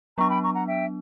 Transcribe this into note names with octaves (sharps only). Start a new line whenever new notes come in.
F#3 B3 D4 A#5 C#6
G5 B5
A#5 C#6
F#5 A#5
E5 G5